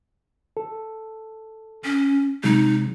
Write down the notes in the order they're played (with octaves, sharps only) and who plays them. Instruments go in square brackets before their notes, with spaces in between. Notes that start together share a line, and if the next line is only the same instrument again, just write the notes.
[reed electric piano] A4
[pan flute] C#4
[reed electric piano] C3 F#3 G#3 [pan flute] D#4